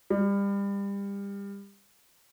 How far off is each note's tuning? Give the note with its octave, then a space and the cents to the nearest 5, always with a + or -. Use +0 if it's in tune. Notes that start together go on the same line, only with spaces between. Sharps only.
G3 +30